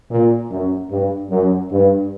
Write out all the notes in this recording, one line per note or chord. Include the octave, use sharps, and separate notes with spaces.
A#2
F#2
G2
F#2
G2